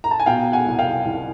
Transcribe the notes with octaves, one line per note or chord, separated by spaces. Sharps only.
A#5
A5
G#5
B2 F5 G5
F#5 G#5
C2
F5 G5
C2